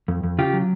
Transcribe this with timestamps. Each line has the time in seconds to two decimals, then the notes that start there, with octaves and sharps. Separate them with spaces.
0.08 F2
0.24 F2
0.39 C#3 F4 G4
0.53 F#3